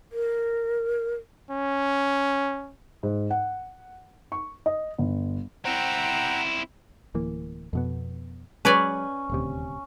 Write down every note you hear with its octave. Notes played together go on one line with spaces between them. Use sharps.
A#4
C#4
G#2
F#5
C#6
D#5
G1
C4 E4 F#5 G5 A#5
D1 E3 A#3
F2 B2 B3
F#3 G#3 C#4 B4 C#5 D5
D#1 D2 C3